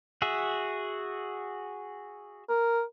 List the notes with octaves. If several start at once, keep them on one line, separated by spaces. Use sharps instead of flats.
F#4 G#4 E5
A#4